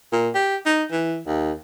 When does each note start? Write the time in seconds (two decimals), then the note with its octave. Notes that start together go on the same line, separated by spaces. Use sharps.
0.12 A#2
0.35 G4
0.66 D#4
0.92 E3
1.27 D#2